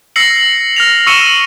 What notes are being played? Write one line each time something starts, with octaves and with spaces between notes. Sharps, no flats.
E6 A#6 C7 C#7 F#7
F6 A#6 F7
C#6 E6 C#7 D#7 E7 G7